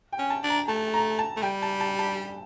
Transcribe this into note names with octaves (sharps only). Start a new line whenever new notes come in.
G5
C#4
A5
D4
A#5
A3 A5
A#5
A5
A3
G3 G5
A5
A5
A5